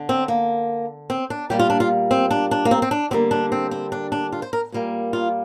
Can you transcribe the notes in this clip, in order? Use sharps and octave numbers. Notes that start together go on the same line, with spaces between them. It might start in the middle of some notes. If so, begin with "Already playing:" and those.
Already playing: D3
C4
A#3
C4
D4
A#2 G3 A#3 G4
F4
D4
F4
C4
D4
D4
A#3
C4
C4
D4
D3 G3 A#3 C4
D4
C4
C4
D4
D4
F4
C5
A#4
A#2 G3 A#3
F4